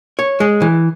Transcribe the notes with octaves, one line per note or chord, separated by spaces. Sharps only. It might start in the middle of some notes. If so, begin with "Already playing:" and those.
C#5
G#3
E3